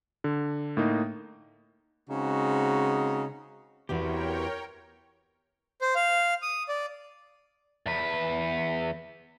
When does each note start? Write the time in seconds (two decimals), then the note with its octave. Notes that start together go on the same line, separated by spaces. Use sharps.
0.24 D3
0.77 A2 A#3 D#4
2.10 C#3 G#3 C4 D#4 F#4
3.89 E2 E3 E4 F#4 G4 A#4 C#5 G5
5.81 C5
5.95 F5
6.42 D#6
6.69 D5
7.86 E2 B4